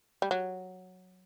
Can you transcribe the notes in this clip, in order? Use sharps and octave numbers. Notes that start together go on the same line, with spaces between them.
G3
F#3